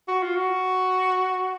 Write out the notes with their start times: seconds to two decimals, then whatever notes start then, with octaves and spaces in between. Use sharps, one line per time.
0.08 F#4
0.23 F4
0.36 F#4